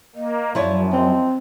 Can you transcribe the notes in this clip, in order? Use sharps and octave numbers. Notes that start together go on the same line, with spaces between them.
A#3 D#5
F#2 F3 E4 C#5 D5
C4 D#5